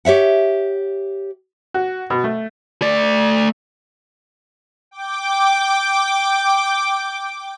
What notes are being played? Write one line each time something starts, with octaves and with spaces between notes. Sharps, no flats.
G4 C#5 E5 F#5
F#4
B2
A3
A3 D5
G5 D6